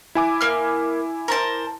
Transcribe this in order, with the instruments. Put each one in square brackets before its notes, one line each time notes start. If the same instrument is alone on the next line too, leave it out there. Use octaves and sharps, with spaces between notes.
[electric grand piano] E4 G#5 D6
[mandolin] A#3 F6
A#4 C5 A5